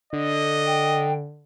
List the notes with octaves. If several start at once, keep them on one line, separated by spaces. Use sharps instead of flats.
D3 D#5
G5